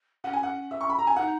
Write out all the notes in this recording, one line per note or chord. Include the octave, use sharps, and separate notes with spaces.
C#4 F#5
G#5
F#5
E5
C#6
B5
A#5
G#5
D#4 F#5